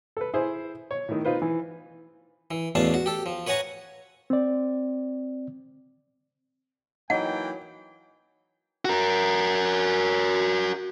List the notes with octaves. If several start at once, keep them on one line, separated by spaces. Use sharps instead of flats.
A4 B4
E4 G#4 C5
C#5
A2 D#3
D#4 F4 B4 C5
E3
E3
A1 E2 B2 D4 F5 A5
F#4
G4 A4
F3
B4 C#5 F#5 G#5 A#5 C#6
C4 D5
E3 F#3 A#3 D#4 D#5 F#5 G5
F#4 A#4